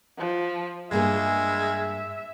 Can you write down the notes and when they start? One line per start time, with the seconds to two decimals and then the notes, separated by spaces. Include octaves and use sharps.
0.18 F3
0.91 G2 G#3 A#3 G#4 E5